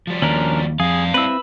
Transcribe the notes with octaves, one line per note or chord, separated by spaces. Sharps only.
F3 G3
D#2 C#4 D4 A#4
F2 G3 G#4 F5
C4 E4 B4 E6